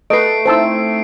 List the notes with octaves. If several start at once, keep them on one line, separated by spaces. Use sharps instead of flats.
A3 B4 D#5 C7 D7
C4 D#4 E4 C5 A5 E6